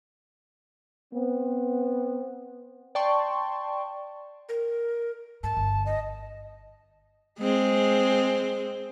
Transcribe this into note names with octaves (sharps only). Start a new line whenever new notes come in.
B3 C4
D5 G5 A5 C6 C#6
A#4
G#2 A5
G1
D#5
G#3 C4